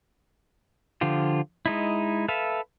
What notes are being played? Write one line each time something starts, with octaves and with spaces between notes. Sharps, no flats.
D3 F3 F4 G4
G#3 D#4 E4
A4 B4 E5 F5